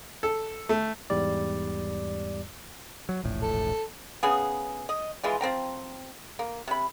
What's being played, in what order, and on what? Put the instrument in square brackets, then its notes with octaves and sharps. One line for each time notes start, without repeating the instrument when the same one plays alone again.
[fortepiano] A4
A3
[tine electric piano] E2 G#2 G3 D5
[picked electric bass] F#3
E1 A#1 A2
[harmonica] A4
[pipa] C#3 B3 G#4
D#5
E3 G#3 F4
F3 C4 G5 A#5
A#3
C3 B5